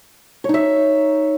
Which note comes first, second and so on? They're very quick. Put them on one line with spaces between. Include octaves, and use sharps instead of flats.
C#5 D#4 E5